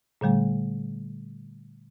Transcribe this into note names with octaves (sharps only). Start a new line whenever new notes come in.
A#2 D3 G3 A3